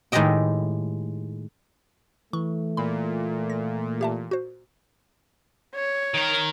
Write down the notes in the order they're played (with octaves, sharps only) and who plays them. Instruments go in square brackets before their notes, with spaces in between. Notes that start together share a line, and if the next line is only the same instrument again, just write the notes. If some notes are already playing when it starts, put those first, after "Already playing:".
[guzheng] A2 D#3 G#3 G4 D#5 G5
[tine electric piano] E3 [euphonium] A3 [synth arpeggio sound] C#6
[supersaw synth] A#2 [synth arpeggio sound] B5
[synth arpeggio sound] A#6
G4 E5 A5
F#4 C5
[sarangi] C#5
[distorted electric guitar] D#3 A#4